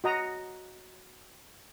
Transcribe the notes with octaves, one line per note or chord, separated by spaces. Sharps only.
F#4 D#5 A#5